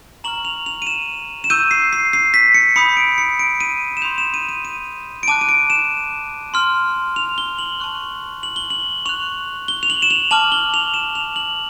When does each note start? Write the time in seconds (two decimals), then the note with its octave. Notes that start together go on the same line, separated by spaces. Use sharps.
0.24 A#5 C#6 F6 F#7
0.45 F7
0.66 F7
0.82 D#7
0.87 E7
1.44 E7
1.50 C#6 E6 G6 D#7
1.71 C7
1.93 C7
2.13 C7
2.34 B6
2.54 C#7
2.76 B5 D#6 G6 C#7
2.97 D7
3.18 C#7
3.39 D7
3.60 D#7
3.97 E7
4.02 C6 D#6 G6 F7
4.18 E7
4.34 D#7
4.49 D#7
4.65 D#7
5.23 D7
5.28 A5 D6 F#6 D#7
5.41 D#7
5.49 D7
5.70 E7
6.54 C6 F6
7.16 F7
7.38 G7
7.58 F#7
7.80 A5 C#6 F#6
8.43 F#7
8.56 G7
8.70 F#7
9.06 C#6 F#6 F7
9.68 G7
9.83 F7
9.90 F#7
10.02 E7
10.11 F7
10.31 A5 D6 F6 F#7
10.52 G7
10.74 F7
10.94 E7
11.15 F7
11.36 F#7